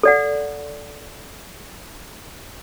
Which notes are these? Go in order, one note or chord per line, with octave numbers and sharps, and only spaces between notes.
A4 D5 F#5